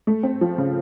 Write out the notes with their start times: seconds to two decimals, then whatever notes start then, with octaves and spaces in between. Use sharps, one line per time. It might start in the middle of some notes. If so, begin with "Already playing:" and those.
0.07 A3
0.23 C4
0.41 F3
0.58 C#3